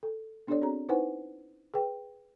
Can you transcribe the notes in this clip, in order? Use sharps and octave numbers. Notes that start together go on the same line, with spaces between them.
A4
B3 D4 G4 A4 C#5 D5
C4 F#4 G#4 C#5 A#5
D#4 E4 B4 C5 F#5 G#5
G#4 B4 G5